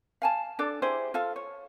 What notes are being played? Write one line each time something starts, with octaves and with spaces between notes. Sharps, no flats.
F5 G#5 A5
D4 A4 D5
E4 G4 G#4 C5
F4 A4 F5
C#5